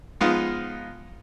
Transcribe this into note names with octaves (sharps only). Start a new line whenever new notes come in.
F3 G#3 B3 D#4 F4